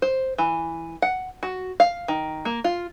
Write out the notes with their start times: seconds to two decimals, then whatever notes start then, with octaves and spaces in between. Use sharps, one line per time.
0.02 C5
0.38 E3
1.02 F#5
1.43 F#4
1.80 F5
2.08 D#3
2.45 A#3
2.64 F4